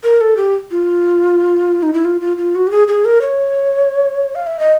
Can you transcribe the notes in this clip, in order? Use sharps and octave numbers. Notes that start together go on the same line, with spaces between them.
A#4
A4
G4
F4
D#4
E4
F4
F4
F4
F#4
G4
G#4
G#4
A#4
C#5
F5
E5
D#5